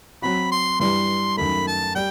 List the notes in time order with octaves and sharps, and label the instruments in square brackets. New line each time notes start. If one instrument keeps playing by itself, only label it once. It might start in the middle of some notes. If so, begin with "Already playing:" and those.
[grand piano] F#3 C4 F#4 [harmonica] B5
[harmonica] C6
[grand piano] G2 E3 G3 [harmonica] C6
[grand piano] F#2 D#3 A3 [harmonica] B5
[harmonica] A5
[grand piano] G3 [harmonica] G5